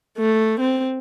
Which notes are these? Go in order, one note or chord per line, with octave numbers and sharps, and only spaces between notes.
A3
C4